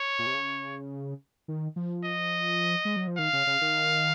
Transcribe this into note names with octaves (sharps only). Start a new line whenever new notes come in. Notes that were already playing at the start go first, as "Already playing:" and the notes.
Already playing: C#5
A#2
C3
C#3
D#3
F3
D#5
G#3
F#3
F3
D#3 F5
C#3
C#3
D#3